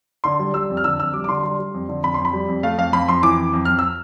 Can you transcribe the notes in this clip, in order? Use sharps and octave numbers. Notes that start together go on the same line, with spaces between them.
D3 C6
G3
G3 E6
F2
F6
D3 E6
F2 E6
G3 D6
D6
D3 C6
G3 C6
G3
F2
D3
F2 B5
F2 C6
B5
G3
F2
A3 F5
F2 F5
F2 B5
F2 C6
E3 D6
F2
F2
F2 F6
E6